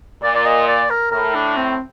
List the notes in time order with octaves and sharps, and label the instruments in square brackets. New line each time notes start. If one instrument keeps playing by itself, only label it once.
[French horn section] A#2 [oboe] D5
[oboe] D5
D#5
D5
A#4
[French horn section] A2 [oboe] A#4
[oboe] D4
C4